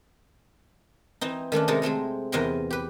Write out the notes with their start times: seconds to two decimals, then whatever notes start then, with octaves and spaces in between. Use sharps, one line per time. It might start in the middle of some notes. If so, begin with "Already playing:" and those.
1.21 E3 C4 D#4
1.52 D#3 A3 C#4 D4
1.68 C3 G#3 D#4 A4 A#4
1.82 G#3 A3 C4 G#4
2.32 E2 C3 A#4 D#5 G5 C6
2.71 G4 B4